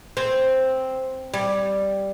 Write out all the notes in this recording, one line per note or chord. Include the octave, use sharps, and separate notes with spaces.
C4
G3